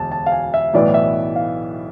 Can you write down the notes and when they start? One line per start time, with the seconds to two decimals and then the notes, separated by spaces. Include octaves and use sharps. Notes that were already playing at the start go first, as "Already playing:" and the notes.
Already playing: E1 D2 A5
0.12 A5
0.26 F5
0.32 G#5
0.54 E5
0.74 B1 A2 E3 B3 D5
0.94 E5
1.36 F5